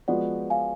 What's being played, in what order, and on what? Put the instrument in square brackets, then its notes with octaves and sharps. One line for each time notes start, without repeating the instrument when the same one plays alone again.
[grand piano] F3 G#3 B3 F#4 [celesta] D5 F#5
[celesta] F5 G#5